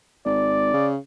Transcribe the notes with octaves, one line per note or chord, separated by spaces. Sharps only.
G#1 D5
C#3